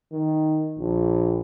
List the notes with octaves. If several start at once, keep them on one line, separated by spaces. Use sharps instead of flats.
D#3
A#1